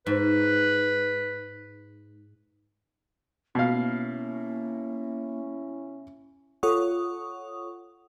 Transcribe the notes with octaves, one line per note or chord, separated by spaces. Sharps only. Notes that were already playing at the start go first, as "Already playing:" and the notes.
G#2 B4
B2 A#3 C#4 E4 F5
F4 A4 C#5 F#5 C#6 D#6